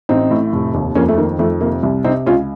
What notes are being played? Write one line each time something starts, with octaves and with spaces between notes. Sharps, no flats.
A1 C4 D#4
A2
F1
D#2
F2 A#3 C#4
A3
D#3 A#3
F2 A3
C3 A#3
C2
C3 C4 D#4
C#2 C#4 F4